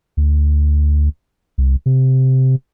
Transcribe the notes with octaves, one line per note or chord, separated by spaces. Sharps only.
D2
C2
C3